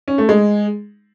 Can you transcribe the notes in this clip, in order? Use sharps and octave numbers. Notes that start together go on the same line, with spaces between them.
C#4
A3
G#3